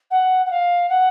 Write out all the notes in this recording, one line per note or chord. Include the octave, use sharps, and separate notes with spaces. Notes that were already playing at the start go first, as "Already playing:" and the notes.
F#5
F#5
F5
F#5